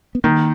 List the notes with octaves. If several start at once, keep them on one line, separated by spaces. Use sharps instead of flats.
B3
D#3 A#3